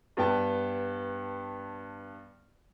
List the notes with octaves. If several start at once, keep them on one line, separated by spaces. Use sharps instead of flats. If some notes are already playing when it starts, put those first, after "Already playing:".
G2 B3 G5 A5